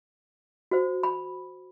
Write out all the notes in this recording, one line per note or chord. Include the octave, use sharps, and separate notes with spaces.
F#4 C5
B5